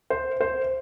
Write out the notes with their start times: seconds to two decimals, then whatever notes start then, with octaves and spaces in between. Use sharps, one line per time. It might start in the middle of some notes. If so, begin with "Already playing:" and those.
0.10 C5
0.41 C5